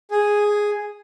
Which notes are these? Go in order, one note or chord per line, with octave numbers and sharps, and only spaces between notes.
G#4